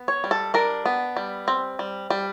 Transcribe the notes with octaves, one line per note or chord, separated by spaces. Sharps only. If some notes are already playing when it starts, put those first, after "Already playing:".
Already playing: B3
C#5
G3
A4
D4 A#4
B3
G3
C4
G3
G3